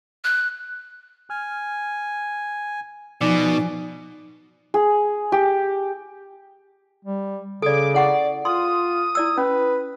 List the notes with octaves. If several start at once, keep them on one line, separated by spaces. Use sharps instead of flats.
F#6
G#5 F6
B2 F3 D#4 D5 G#5 D6
G#4
G4
G3
C#3 A4 D5 D6
E4 D5 F#5 C#6
F4 C6 D#6
E4 D5 E6
C#4 B4